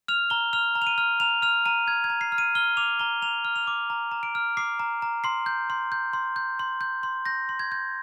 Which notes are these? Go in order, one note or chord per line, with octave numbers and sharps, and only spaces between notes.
F6 F7
A#5 G7
F6 F7
A#5
F7
D#7
F6
A#5 F7
F6 F7
A#5 D#7
F6 G#6
G#6
A#5
C7
F6
D#7
F6 G7
D6 F7
A#5 G7
A#5 F7
F6
F7
D6
A#5
A#5
D7
F6
D6 C7
A#5
A#5
C6 C7
G6
C6
G6
C6
G6
C6
G6
C6
G6 A#6
C6
G#6
G6